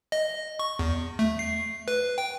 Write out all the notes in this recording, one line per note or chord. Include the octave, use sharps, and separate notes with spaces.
D#5
C#6
E2
A3
C7
B4
G5